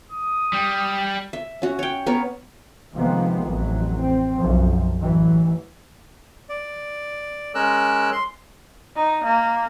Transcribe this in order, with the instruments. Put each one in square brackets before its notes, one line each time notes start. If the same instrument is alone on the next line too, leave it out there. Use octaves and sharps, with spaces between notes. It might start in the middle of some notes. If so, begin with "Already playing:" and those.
[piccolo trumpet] D#6
[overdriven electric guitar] G3
[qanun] E5
C#4 F#4
C#5 G5
B3 A#4 C#5
[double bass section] C3 D#3 F3 G#3 A#3 B3
A1 F2 E3 F#3
C4
B1 F#2 F3
A1 E3 F#3
[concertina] D5
G#3 C#4 A#4 E6 F#6
C6
[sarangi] D#4
A#3